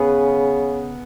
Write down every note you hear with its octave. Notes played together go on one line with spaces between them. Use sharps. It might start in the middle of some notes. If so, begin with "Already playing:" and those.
Already playing: C#3 B3 G#4 B4